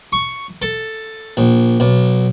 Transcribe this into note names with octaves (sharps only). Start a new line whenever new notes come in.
C#6
A4
A#1
B1